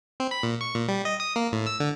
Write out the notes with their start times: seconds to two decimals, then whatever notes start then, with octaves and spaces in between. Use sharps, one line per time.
0.20 C4
0.31 B5
0.43 A#2
0.61 C#6
0.75 A#2
0.88 G3
1.05 D#5
1.20 D#6
1.36 A#3
1.52 A2
1.66 E6
1.80 D3